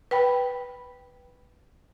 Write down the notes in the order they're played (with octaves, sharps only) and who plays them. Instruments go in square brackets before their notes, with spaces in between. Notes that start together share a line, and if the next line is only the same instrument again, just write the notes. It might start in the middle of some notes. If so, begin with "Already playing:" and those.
[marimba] B4 G5 B5